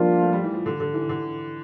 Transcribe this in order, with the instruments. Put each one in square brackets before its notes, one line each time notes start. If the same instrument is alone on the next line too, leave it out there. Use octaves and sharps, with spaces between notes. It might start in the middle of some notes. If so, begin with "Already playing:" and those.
Already playing: [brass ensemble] F3 A#3 D4 F4 [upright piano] G3
[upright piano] A3
G3
E3
F3
D3
D3
E3
D3